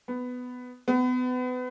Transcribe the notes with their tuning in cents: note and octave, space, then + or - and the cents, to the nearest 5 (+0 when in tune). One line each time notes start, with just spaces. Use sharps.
B3 +10
B3 +30